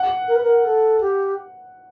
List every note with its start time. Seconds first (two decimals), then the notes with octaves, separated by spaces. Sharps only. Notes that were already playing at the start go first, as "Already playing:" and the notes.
Already playing: F#5
0.28 A#4
0.36 B4
0.43 A#4
0.65 A4
1.01 G4